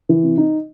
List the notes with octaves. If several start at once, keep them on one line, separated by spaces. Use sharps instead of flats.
E3
C3
D#4